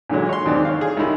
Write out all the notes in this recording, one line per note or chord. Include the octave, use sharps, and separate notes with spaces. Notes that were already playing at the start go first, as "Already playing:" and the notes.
A#2 D3 E3 F#3 G#3
C#5 C6
D#2 G#2 E3 C4 D4
C#5 F5
G#4
C2 D#4 E4